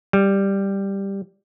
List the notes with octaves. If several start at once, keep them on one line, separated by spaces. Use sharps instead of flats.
G3